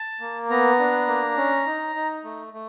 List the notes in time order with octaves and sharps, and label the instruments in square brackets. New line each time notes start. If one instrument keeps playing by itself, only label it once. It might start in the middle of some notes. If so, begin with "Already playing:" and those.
Already playing: [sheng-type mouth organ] A5
A#3
B3 A#5
D4
A#3
C#4
D#4
D#4
A3
A3